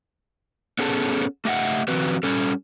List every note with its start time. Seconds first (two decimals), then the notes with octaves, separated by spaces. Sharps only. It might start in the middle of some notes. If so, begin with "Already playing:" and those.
0.79 B3 C#4 G#4 A4 A5
1.45 A3 G4 D#5 E5 F#5
1.88 D#3 F3 C4 F#4 B4
2.23 G3 C#4 A4